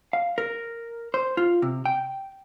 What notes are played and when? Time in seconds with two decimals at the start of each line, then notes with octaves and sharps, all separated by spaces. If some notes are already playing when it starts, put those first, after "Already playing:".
0.13 F5
0.38 A#4
1.14 C5
1.37 F4
1.62 C3
1.86 G5